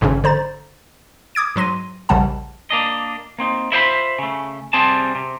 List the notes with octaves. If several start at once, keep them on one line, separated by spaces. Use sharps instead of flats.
G#1 G#2 C#3 C#4
D3 C5 A#5 A6
D6 D#6 G#6 D7
G#2 F#3 C6 A#6 D#7
A#1 D#2 C#3 G3 F#5 A5
A#3 D4 D#5
A#3 C4 D#4
E4 F4 C5 D5 E5 B5
C#3 A3
C3 G3 C4 G#4 A5
C3